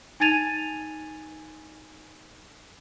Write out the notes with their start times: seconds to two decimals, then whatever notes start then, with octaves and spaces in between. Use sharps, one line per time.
0.20 D#4 G#5 G#6 A6 D#7 F7